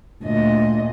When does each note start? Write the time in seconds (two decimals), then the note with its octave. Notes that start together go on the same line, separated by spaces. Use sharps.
0.24 D2 A#2 D#5